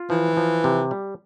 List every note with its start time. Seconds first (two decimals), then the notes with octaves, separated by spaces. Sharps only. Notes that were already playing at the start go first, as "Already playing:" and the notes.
Already playing: F4
0.10 E3 F3
0.37 F3
0.64 C3
0.91 G3